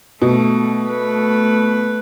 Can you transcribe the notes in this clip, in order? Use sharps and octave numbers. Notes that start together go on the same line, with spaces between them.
B2 A3
A3 B4